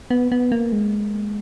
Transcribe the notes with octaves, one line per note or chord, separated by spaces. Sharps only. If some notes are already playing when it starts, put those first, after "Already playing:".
B3
B3
A#3
G#3